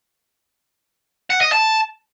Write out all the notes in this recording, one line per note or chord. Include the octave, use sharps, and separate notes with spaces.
F#5
D#5
A5